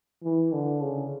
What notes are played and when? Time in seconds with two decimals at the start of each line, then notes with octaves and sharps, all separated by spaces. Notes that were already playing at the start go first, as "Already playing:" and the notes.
0.24 E3
0.53 D3
0.82 C#3